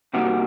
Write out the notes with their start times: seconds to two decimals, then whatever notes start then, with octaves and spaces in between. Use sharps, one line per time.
0.14 C3 D#3 G3 A#3 F#4